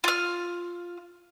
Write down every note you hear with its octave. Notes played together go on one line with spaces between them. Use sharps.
F4 F6